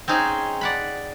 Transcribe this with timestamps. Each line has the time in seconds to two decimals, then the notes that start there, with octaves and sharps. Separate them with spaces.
0.08 C4 C#4 D#4 G#4
0.61 D5 F#5 B5